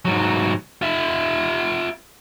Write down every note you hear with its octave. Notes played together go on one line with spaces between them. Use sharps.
G#2 F#3
F4 E5